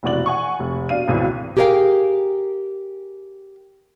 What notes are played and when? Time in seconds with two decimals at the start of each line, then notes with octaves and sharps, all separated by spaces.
0.03 F1 B2 E3 F#4 D5 F#7
0.26 F#5 G#5 C#6
0.59 F1
0.89 B2 D4 F5 D#7
1.08 G#1 C#2 B2 E3
1.57 G4 G#4 A#4 C5 F5 G5